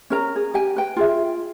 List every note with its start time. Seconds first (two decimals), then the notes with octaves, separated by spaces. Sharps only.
0.10 C#4 A#4 A#5
0.36 G#4
0.54 G4 G5 G#5
0.76 B4 G5
0.96 F4 G#4 E5